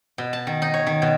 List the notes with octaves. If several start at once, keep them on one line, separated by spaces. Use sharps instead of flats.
B2
A5
D#3
D#4
C#5
D#3
B2